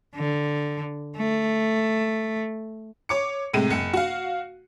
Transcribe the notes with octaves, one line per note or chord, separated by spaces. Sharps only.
D3
A3
C#5 D6 C#7
A2 C3 G#3 D#7
F#1 C#7
F#4 F5